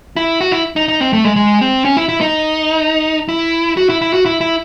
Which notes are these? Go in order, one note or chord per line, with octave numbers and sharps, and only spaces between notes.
E4
F#4
E4
D#4
D#4
C4
A3
G#3
G#3
C4
C#4
E4
E4
D#4
E4
F#4
E4
E4
F#4
E4
E4